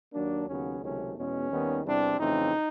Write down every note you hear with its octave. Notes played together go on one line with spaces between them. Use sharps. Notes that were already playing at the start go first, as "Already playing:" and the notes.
D#2 D#3 F#3 A#3 D4
D#2 C#3 F#3 B3 C#4
C#2 C3 D#3 F#3 A3 C#4
E2 B2 G#3 B3 C#4
D#2 D#3 G3 B3
E2 C3 E3 G3 C4 D4
F2 C#3 E3 A3 C4 D#4